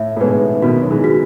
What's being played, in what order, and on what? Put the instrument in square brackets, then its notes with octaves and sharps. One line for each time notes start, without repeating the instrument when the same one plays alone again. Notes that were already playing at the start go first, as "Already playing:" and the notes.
Already playing: [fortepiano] A2 [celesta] E5
[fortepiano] A2
[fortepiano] G#2 B2 [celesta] B4
[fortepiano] B2 D#3 [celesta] F#4
[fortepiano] F#3
E3 G#3
[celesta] F#4